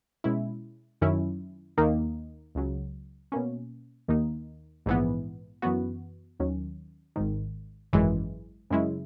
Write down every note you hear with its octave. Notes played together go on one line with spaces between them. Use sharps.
B2 G#3 C#4 E4
F#2 D#3 F#3 C#4 E4
D#2 D#3 A#3 D#4
C#2 C#3 F#3
B2 A#3 C#4
D#2 D#3 A#3 D#4
A#1 G#2 E3 B3
F#2 E3 B3 F#4
D#2 D#3 F#3 C#4
G#1 G#2 D#3
G#1 F#2 E3 G#3
F#2 C#3 G#3 C#4 E4